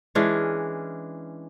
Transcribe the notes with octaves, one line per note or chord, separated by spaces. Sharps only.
E3 G#3 C#4 D4